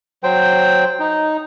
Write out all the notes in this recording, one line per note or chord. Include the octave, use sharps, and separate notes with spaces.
F#3 C5 G5
D#4